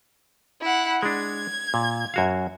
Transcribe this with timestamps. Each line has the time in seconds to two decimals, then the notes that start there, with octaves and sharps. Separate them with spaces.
0.61 E4 F#5
1.03 G#3 D4 G#6
1.74 A#2
2.14 F#2 F#4 F5